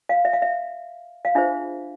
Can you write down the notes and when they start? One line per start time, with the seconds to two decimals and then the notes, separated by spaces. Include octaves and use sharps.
0.09 F5
0.25 E5
0.33 F5
0.42 E5
1.25 F5
1.35 D4 F4 G#4 C5 E5